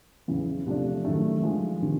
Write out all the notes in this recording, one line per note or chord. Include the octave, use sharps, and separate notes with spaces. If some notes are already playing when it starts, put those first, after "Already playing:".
E2 C#3 E3
C3 F3 A3 D4
F#2 D#3 F#3 A3
D3 F3 G#3
C3 D#3